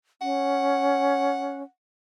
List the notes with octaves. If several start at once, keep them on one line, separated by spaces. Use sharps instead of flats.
C#4 F#5